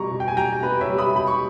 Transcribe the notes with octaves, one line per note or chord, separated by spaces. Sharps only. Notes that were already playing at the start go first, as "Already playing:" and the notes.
Already playing: B2 G3 A#5 C#6
B2
G5
G#5
G3 G5 A#5
B2 B4
C#5 E5
G3
B5 D#6
B2 B5
C#6